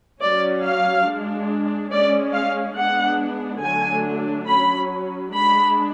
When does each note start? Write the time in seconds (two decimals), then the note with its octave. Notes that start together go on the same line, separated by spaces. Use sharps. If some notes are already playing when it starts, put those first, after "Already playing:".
0.21 F#3 C#4 D5
0.64 F5
1.07 G#3 D4
1.91 G#3 C#4 D5
2.34 F5
2.78 G#3 B3 D4 F#5
3.62 D3 F#3 A3 D4 G#5
4.47 F#3 C#4 B5
5.33 G#3 D4 B5